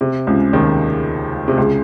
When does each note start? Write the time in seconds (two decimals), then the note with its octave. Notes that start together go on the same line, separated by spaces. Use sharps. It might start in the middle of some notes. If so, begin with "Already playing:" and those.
0.01 C3
0.27 C#2 C#3
0.53 D#2 D#3
1.48 C3
1.58 C#2 C#3